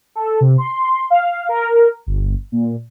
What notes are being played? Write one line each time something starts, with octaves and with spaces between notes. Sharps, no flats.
A4
C3
C6
F5
A#4
G1
A#2